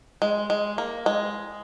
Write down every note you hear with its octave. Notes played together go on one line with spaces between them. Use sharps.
G#3
G#3
A#3
G#3